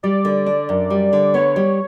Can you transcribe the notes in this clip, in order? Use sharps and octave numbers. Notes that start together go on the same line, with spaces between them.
G3 D5
D3
D4
F#2
G3
D3
B3 C#5
G3